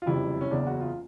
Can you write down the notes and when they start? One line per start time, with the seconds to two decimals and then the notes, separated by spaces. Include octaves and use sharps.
0.02 F4
0.06 F#1 F2 C3 D#3 G3 E4
0.41 C#4
0.51 F#1 E2 C#3 D4
0.67 F#4
0.81 F4